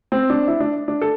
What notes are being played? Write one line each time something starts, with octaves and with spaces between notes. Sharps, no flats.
C4
D4
E4
D4
D4
A4